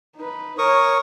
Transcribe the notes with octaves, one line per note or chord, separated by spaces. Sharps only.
D#4 B4
A#4 C#5 C#6 D#6